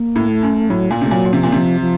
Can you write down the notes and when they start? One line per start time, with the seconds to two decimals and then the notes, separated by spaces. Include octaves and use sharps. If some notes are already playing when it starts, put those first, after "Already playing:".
Already playing: A#3
0.15 A2
0.28 A3
0.42 F#2
0.70 A2 F#3
0.91 A#2 A#3
1.01 C3 A3
1.11 A#2 F#3
1.25 A#2
1.33 C3 F3
1.43 A#2
1.52 C3 F3
1.81 F3